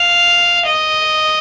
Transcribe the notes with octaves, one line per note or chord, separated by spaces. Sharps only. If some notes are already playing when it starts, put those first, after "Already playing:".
Already playing: F5
D#5